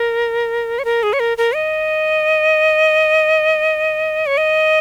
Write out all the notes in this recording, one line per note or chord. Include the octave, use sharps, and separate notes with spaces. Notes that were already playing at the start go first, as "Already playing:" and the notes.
Already playing: A#4
C#5
A#4
G#4
C#5
A#4
A#4
D#5
C#5
D#5